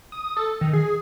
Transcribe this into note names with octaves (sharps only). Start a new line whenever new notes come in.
D#6
A4
D#3
G#4